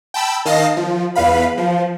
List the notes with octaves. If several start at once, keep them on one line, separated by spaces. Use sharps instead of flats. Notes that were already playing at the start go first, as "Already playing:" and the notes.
G5 A5 B5 E6
D#3 D#5 F5 A5 A#6 C7
F3
E2 B4 F5 B5
F3